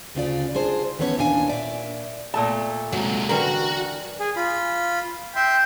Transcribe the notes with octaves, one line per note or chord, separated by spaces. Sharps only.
D2 C#3 F4 D5
D4 F4 G#4 C5
D#3 E3 A3 B3 C#4 C#5
D#2 A#2 D4 F5 G#5
A#2 C#5 D5 E5
A#2 A3 A5
G#2 C3 F#3
D3 E3 G3 F#4 A#4
G#4
F4 B5
E5 G5 C6